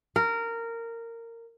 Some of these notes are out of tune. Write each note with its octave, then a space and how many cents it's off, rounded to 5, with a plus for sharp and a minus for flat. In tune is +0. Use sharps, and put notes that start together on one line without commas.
A#4 -15